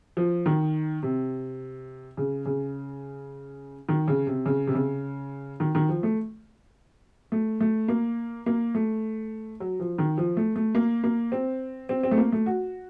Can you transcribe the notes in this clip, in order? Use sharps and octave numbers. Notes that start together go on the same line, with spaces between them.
F3
D#3
C3
C#3
C#3
D#3
C#3
C3
C#3
C3
C#3
D#3
D#3
F3
A3
A3
A3
A#3
A#3
A3
F#3
F3
D#3
F3
A3
A3
A#3
A#3
C4
C4
C4
A3
A#3
A3
F#4